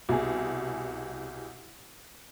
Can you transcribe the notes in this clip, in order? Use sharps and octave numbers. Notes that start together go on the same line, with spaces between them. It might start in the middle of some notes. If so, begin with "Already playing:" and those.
C2 B2 G#4